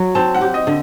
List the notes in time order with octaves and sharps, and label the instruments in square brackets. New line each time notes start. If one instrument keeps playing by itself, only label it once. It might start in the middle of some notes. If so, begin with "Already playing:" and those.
Already playing: [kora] F#3
[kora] C4 [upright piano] A5
[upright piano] F#5
[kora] G4
[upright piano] D#5
[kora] D3